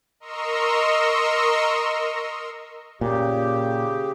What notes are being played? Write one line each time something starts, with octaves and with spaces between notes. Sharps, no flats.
A#4 D#5 A#5 C6 C#6 E6
A#2 C#3 G4